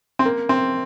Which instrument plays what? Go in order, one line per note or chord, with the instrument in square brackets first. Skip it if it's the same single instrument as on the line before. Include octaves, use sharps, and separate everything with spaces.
[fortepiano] C4
A#3
C4